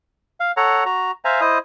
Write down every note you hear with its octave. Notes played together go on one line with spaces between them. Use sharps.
F5
A4 C#5 F#5 A#5
F#4 A#5
C5 E5 F5 G#5 A#5
E4 C5 D#5 D#6